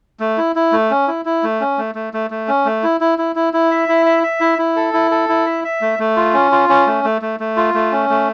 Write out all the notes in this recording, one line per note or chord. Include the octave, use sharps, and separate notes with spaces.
A3
E4
E4
A3
C#4
E4
E4
A3
C#4
A3
A3
A3
A3
C#4
A3
E4
E4
E4
E4
E4
E5
E4
E5
E5
E4
E4
A4
E4
A4
E4
E5
E5
A3
A3
F4
C#4
F4
C#4
A3
A3
A3
A3
F4
A3
C#4
A3